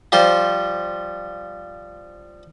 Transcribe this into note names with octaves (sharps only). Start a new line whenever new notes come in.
F3 G3 C5